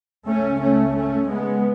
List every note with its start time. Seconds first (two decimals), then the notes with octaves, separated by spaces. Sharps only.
0.27 C#2 C#3 A3 C#4
0.62 A3 C#4
0.96 A3 C#4
1.30 G#3 B3